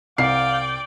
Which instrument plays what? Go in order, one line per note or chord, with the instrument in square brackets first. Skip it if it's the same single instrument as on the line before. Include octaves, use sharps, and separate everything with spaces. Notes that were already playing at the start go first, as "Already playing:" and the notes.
[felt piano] C2 C7 [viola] D5 G5 [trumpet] F5